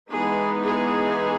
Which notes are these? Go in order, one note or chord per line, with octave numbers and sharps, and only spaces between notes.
E3 G#3 B3 D#4 G#4
G#4